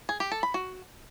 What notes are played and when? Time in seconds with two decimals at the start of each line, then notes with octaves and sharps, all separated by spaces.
0.09 G#4
0.20 G4
0.32 A4
0.43 B5
0.54 F#4